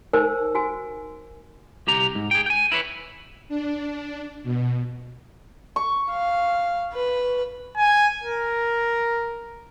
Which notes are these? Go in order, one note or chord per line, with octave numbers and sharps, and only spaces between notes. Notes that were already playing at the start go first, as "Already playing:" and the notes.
D#4 A#4 C5 G#5 E6
F#4 G#5
C2 G4 A#5
G#2
G#4 G5
G5 G#5
E4 A#4 B4 C#5
D4
B2
C#6
F5
B4
G#5
A#4